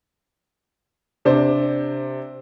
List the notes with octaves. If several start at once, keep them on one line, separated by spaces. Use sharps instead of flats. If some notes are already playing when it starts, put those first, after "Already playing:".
C3 D4 C5